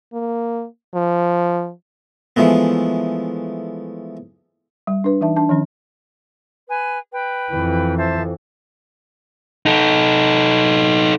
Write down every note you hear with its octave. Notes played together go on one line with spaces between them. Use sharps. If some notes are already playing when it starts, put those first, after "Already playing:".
A#3
F3
E3 F3 G#3 A3 B3
G3
D4 B4
E3 D#4 E5 A5
D4 A5
D#3 F3 C#4
B4 G#5
B4 G5
F2 E3
C5 E5 A5
D#4 A4